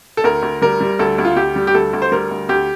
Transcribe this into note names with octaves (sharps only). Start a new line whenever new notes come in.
A4
D2 A#4
D2
G3 A#4
G3
D2 A4
D2
F4
D2 G4
G3
G4
D2 A4
D2
C5
G3 A#4
D2
D2 G4